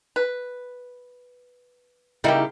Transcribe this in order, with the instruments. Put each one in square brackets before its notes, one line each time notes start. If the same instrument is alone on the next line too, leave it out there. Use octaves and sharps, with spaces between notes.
[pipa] B4
[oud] C#3 D#4 E4 [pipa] G3 A#3 G4